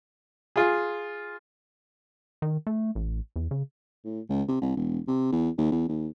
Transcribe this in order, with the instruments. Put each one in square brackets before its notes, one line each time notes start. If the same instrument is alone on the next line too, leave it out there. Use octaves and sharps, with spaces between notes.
[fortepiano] F4 G#4
[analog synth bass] D#3
A3
A1
E2
C#3
[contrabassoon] A2
C#2
C3
C2
E1
C3
E2
D#2
E2
D#2